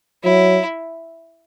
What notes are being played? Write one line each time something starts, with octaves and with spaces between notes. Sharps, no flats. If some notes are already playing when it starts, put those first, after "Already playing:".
F#3 E4